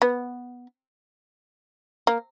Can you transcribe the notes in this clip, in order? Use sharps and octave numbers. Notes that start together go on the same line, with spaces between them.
B3
A#3